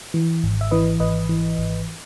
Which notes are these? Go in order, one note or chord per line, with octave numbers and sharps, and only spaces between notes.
E3
G#1
E5
E3 B4 D#5
G#1 B4 D#5
E3
G#1